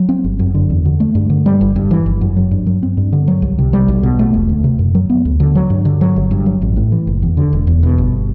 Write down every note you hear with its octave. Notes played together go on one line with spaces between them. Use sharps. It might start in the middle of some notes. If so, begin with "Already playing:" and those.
Already playing: F#3
C4
G1
F#2
D3
E2
D3
A3
G2
D3
G3
G1
G2
E3
G1
F#2
F#3
G2
F#3
C4
G2
D3
F#3
C2
C3
G3
B1
B2
A3
E1
D2
C3
F#2
F#3
B3
D2
D3
F#3
G2
D3
F#3
G1
G2
F#3
A1
A2
E3
F#1
E2
D3
E1
E2
B2
G1